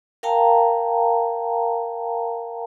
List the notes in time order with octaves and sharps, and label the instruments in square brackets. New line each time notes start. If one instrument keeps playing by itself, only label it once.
[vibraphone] A#4 F5 G5 A5 A#5